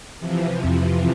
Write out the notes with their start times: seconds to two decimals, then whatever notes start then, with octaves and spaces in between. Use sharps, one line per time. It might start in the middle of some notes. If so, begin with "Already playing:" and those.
0.19 C3 E3 F3
0.64 F2